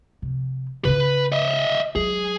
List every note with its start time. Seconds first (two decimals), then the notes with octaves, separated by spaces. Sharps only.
0.22 C3 F3
0.85 C#3 C#4 B4
1.32 D#5 E5
1.96 F#3 G#3 G#4